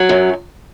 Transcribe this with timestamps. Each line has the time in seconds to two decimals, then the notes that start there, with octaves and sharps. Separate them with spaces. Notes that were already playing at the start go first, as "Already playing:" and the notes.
Already playing: F#3
0.09 F#2